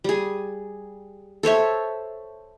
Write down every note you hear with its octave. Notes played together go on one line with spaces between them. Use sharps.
G3 G#4
A4 C5 C#5 E5